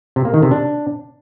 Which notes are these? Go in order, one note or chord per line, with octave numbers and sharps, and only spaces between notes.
C3
A#3
D#3
C3
D4